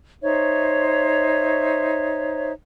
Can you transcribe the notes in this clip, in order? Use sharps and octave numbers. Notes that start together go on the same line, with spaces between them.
D#4 C5 C#5 E5